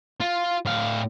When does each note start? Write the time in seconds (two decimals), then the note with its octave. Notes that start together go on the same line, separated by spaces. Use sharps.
0.20 F4
0.65 A2 F5